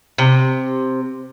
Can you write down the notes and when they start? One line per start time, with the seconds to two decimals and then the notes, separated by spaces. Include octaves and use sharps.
0.18 C3